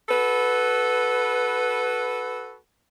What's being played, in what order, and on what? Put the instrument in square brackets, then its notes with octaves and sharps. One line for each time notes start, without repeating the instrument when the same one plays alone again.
[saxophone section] F#4 A4 B4